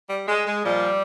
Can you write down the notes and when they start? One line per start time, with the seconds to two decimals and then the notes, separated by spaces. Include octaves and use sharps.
0.09 G3
0.27 G#3
0.46 G#3
0.63 A#2 F3 G3